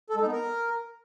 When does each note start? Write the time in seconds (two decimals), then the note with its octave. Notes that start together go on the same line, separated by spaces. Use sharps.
0.10 A4
0.15 G#3
0.21 D#4
0.27 B3
0.32 A#4